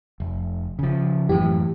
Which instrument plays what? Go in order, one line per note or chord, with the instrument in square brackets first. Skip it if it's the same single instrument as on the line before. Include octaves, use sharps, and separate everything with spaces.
[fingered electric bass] F1
C#3 F3
[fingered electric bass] F#2 A2 [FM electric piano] E3 G4